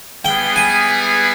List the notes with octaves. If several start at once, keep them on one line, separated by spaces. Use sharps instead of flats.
G3 B3 E4 G#4 B4 G5
G#5